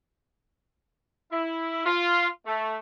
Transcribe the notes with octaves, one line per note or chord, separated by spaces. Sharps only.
E4
F4
A3